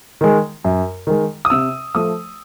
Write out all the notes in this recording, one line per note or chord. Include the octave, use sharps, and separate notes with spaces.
D#3 G#3
F#2
D#3 G#3
D#6
C3 E6
F3 A3 D#6